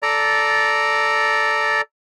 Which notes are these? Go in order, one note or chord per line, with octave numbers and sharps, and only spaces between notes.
A4 D5 A#5